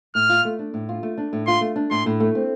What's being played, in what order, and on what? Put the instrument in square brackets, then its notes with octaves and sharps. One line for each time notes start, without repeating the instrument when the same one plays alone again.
[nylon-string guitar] A2 [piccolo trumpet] F6
[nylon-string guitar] F4
A3
D4
A2
F4
A3
D4
A2
[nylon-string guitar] F4 [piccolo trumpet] C6
[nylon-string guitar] A3
D4
[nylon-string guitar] A2 [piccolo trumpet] C6
[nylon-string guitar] A2
A3
C4